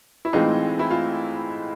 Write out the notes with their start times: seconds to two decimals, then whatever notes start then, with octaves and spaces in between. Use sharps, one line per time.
0.25 E4
0.33 A2 E3 G#3 C4 D#4 F4
0.79 E4
0.91 F4